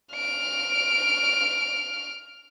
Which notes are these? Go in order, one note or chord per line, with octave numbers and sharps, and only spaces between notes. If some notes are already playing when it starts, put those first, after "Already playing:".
F6 D7